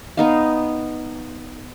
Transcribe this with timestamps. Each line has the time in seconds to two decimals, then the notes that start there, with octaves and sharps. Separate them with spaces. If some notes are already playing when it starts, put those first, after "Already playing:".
0.17 B3 D#4 F5